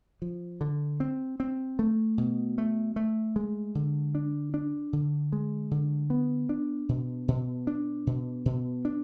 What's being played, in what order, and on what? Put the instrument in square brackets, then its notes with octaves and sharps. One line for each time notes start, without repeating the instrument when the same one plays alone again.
[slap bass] F3
D3
C4
C4
A3
B2
A3
A3
G#3
D3
D4
D4
D3
G#3
D3
B3
D4
B2
B2
D4
B2
B2
D4